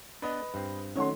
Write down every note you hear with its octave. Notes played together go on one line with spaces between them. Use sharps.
B3 D4 B4 D#5
G2 C4
D#3 F#3 A3 C#4 C#5 F#5 C6